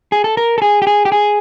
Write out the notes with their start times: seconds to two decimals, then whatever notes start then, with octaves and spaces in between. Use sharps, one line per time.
0.12 G#4
0.24 A4
0.37 A#4
0.58 A4
0.62 G#4
0.82 G4
0.87 G#4
1.05 G4
1.12 G#4